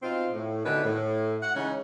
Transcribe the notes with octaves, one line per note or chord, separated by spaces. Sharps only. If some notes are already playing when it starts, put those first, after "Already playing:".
B2 C4 D#4 F4
A2
B2 D3 D#3 A3 C#4 B4
A2
F#5
C#3 E3 G#3 C#4 D#4